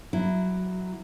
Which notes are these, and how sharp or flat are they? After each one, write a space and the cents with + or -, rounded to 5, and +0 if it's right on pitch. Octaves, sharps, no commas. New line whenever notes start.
F#3 +0 E4 +0